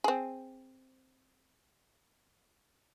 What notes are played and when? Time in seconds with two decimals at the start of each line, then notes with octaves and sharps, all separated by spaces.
0.04 C4 G#4